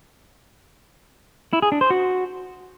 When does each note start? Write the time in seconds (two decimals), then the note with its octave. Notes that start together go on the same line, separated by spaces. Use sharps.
1.53 E4
1.62 G#4
1.72 D4
1.81 C5
1.90 F#4